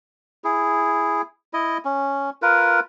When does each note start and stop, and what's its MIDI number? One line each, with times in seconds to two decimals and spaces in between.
0.44 1.22 64
0.44 1.22 68
1.53 1.78 64
1.53 1.78 75
1.85 2.30 61
2.42 2.80 65
2.42 2.80 70
2.42 2.80 71